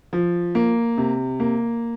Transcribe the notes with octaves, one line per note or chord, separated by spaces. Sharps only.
F3
A#3
C3
A#3